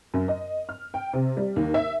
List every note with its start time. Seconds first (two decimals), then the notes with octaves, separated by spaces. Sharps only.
0.14 F#2
0.28 D#5
0.69 F6
0.94 G5
1.13 C3
1.37 G3
1.56 D#2
1.74 E5